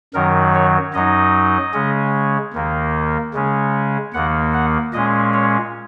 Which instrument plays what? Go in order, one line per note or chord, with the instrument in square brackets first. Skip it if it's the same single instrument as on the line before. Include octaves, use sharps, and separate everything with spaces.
[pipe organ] F#2 D#3 F#3 A#4
C#5
F#2 F#3 D#4 D#5
C#3 G#3 C#4
D#2 D#3 A#3
C#3 G#3 C#4
D#2 D#3 A#3 F#5
F#5
A#2 G#3 C#4 D#5
C#5